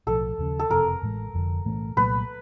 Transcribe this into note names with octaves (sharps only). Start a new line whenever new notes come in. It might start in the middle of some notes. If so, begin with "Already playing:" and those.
B1 A2 F3 A4
D#2 C#3 F3
A4
F#1 F2 C3 F3 A#4
A1 A2 E3 G#3
F1 F2 D3
B1 A2 E3 A3
C2 A#2 F#3 A3 B4